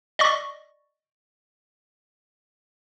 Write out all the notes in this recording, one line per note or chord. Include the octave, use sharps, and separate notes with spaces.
D5 D#5 C#6